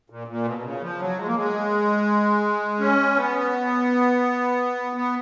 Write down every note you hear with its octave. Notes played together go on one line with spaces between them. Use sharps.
A#2
A#2
B2
B2
C#3
F3
F#3
G#3
A#3
G#3
C#4
B3
B3